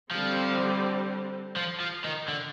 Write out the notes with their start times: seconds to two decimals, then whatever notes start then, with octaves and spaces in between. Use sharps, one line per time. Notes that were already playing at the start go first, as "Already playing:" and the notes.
0.11 D3 F3 G3 C4
1.57 F3
1.80 F3
2.05 D#3
2.28 D3